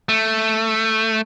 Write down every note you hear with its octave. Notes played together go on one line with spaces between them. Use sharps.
A3